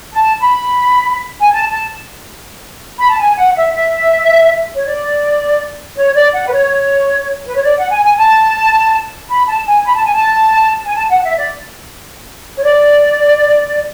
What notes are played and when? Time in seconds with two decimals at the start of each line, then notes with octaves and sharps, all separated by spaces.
0.14 A5
0.40 B5
1.41 G#5
1.52 A5
1.70 A5
2.98 B5
3.08 A5
3.19 G#5
3.37 F#5
3.56 E5
3.74 E5
4.75 C#5
4.86 D5
5.96 C#5
6.14 D5
6.33 F#5
6.47 B4
6.52 C#5
7.46 B4
7.55 C#5
7.63 D5
7.77 F#5
7.91 G#5
8.04 G#5
8.18 A5
9.30 B5
9.48 A5
9.67 G#5
9.85 B5
9.95 A5
10.05 G#5
10.14 A5
10.85 G#5
10.95 A5
11.10 F#5
11.23 E5
11.38 D5
12.57 C#5
12.63 D5